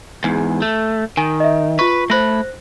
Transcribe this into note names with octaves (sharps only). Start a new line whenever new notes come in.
E2 G#2
A3
D#3 G#5
D#5 E5
F4 B4 C#6
A3 C5 B5 F#6 A#6